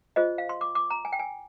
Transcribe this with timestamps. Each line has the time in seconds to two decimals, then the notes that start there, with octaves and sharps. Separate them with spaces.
0.16 F4 G#4 C5 D#5
0.38 F5
0.49 C6
0.61 D6
0.75 D6
0.90 A#5
1.05 G#5
1.13 G5
1.19 G#5